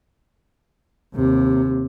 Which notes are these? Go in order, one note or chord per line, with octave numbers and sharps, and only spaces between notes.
D#2 C3